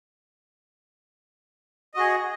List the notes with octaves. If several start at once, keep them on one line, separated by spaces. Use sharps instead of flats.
F#4 G#4 D#5